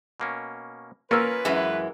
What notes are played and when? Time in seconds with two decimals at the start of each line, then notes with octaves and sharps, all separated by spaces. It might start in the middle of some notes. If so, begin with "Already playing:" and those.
0.20 B2 A#3 C#4
1.11 A#3 C#4 F4 A#4 B4 E6
1.45 F#2 E3 G#3